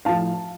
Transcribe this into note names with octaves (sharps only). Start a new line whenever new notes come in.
A2 F3 F5 A5